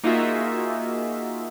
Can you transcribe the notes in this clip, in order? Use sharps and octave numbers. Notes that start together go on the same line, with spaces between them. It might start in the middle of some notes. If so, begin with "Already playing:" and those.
A#3 D#4 F4 F#4 G#4 E5